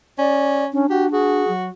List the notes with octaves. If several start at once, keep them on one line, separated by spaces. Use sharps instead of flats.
C#4 D5
C#4 D4
F#4 G4
F#4 G#4
F#3